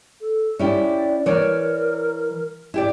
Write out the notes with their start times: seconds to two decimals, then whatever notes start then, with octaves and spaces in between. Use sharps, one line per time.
0.21 A4
0.59 C#4 E4 G4 D5
1.26 E3 A#4 C#5 D5
2.74 E4 G4 D5